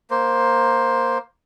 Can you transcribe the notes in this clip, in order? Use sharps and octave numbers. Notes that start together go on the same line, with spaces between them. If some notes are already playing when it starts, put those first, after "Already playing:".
A#3 C5